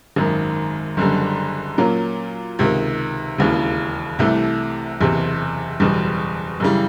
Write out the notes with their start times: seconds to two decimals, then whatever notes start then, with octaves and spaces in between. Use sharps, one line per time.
0.16 G#1 F#2 D#3
0.97 F#1 F#2 D3 G3
1.77 A#2 F#3 A#3 C#4
2.59 C#2 C3 D#3
3.38 E1 D#2 C#3 E3
4.19 C2 C3 E3 A3
5.00 F#1 E2 C3
5.80 F#1 E2 B2 G3
6.60 F#2 C#3 E3 G3